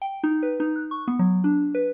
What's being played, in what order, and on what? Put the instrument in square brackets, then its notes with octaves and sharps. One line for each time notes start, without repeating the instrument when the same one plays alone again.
[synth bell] G5
D#4
B4
D#4
F#6
C#6
B3
F#3
D4
B4